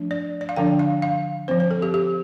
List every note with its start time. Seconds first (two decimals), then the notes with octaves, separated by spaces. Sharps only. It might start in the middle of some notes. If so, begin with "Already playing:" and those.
Already playing: F3 A3 D4
0.11 D5
0.41 D5
0.49 F5
0.56 D3 F3 D4 G5
0.79 F5
1.02 F5
1.48 F3 C4 C5
1.60 C5
1.71 A4
1.82 G4
1.94 G4